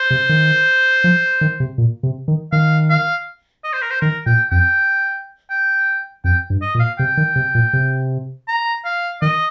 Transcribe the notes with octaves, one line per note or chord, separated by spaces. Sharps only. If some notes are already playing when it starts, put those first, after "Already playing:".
Already playing: C5
C3
D#3
F3
D#3
C3
A#2
C3
D#3
D#3 F5
F5
D#5
C5
A#4
C5
D#3 A#4
A#2 G5
F2 G5
G5
F2 G5
G2
D#5
A#2
F5
C3 G5
D#3
C3
A#2
C3
A#5
F5
D#3 D#5